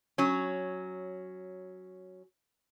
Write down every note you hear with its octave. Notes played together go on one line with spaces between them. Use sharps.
F#3 C#4